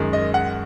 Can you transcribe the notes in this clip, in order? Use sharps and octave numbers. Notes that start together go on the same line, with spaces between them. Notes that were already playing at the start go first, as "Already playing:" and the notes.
Already playing: F#2 D#3 G#3
D#5
F#5